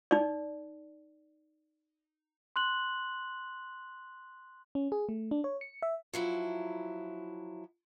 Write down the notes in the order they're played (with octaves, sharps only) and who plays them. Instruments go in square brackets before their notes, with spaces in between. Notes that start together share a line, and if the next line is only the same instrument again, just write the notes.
[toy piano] D#4 D5
[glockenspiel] C6 F#6 F#7
[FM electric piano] C#4
G#4
A3
D4
C#5
C#7
E5
[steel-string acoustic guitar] F3 F#3 E4